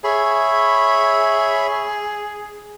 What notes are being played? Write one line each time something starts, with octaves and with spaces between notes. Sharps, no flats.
G#4 C#5 E5 B5